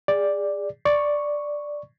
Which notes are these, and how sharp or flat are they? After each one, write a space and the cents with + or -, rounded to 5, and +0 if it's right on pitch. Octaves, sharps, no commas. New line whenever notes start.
G#4 -25 D5 +0
D5 +0 C#6 +0